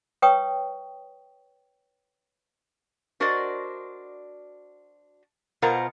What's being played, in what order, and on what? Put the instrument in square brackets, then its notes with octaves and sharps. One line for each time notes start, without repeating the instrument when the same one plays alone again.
[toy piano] B4 C#5 G5 C#6 D#6
[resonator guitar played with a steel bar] D4 F#4 A#4 C5 D5 D#5
B2 F4 A#4 C5 F#5 A#5